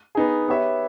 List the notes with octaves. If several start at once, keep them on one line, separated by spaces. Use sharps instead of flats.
B3 D#4 G#4
B3 G4 C#5 E5